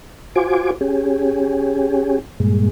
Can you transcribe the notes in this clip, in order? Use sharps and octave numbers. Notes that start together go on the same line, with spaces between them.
F4 F#4 C5 G#5 D6
C#4 G4 G#4
G2 A#2 G#3